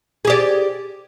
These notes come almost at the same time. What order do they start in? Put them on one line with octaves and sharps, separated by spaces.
G#4 G4 D5